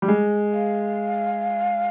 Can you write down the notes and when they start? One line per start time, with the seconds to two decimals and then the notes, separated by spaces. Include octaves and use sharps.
0.02 G3
0.08 G#3
0.54 F5